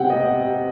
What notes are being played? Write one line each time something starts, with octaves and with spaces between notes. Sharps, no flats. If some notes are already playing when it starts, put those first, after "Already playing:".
Already playing: C3 F#5 G5
D#5